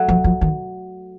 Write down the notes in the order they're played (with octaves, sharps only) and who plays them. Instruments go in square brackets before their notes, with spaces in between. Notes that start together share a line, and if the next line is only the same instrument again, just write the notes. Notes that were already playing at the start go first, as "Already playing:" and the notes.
Already playing: [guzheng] F#3 A3
[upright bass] F3
F3
D#3